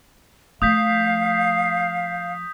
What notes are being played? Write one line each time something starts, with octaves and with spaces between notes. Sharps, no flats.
F3 A3 F5 D#6 G6 B6